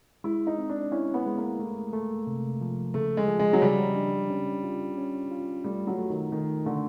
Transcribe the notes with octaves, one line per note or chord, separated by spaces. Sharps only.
G#3 E4
D#4
C4
D4
C#4 E4
B3
G#3
A#3
A3
A3
C3
F3
C#3 A3
G#3
F3
G#3
F#3
C#3 G3
D4
C#4
F4
C#4
F4
G3 A3
F#3
A3
D#3
D#3 A3
D3 A3